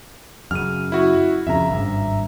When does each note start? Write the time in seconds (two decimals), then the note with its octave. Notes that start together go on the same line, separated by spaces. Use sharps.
0.51 F#2 C#3 F6 D#7
0.92 E4 F#4
1.47 F2 C#3 E5 A#5
1.70 G#1 G2